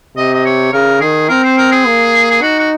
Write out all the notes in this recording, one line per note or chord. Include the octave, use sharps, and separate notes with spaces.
C3 D#5
D#5
C#5
C#3 A#4
D#3 G#4
C4 A#4
C5
A#4
G#4
A#3
G#4
D#4 F#4
F#4